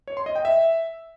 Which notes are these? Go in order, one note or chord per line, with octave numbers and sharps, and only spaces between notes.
C#5
C6
D#5
G5
E5